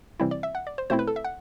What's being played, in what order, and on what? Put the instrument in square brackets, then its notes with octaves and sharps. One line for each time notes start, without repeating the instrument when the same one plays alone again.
[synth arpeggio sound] C3 E3 G3 C4 E4
D5
E5
F#5
D5
C5
B2 A3 C4 E4 C5
B4
A4
E5
F#5